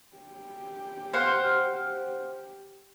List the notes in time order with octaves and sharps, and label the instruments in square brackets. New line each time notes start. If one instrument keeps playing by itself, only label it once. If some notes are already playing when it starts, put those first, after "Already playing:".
[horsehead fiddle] G4
[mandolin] C5 F5 F#5